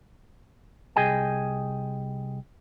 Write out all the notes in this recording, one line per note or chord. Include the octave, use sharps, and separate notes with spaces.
C2 G#4 D#5 G5 G#5